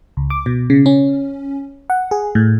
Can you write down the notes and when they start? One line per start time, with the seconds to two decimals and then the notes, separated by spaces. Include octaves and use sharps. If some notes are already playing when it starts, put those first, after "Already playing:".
0.17 C#2
0.30 D6
0.46 B2
0.70 C#3
0.86 C#4
1.90 F#5
2.11 G#4
2.35 A2